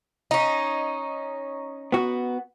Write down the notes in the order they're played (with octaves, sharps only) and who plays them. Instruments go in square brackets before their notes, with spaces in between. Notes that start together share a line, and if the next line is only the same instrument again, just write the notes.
[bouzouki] C#4 D#4
[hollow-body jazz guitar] B3 F#4